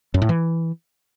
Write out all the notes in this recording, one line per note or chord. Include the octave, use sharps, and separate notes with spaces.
F#2
A2
E3